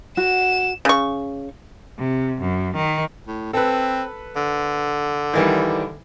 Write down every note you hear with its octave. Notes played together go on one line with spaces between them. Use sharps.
F#4 E7
C#3 C#6
C3
F#2
D#3
A2
C4 A4 B4
D3
D#3 E3 G3